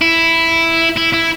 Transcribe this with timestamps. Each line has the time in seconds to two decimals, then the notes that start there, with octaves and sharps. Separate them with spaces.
0.01 E4
0.96 E4
1.13 E4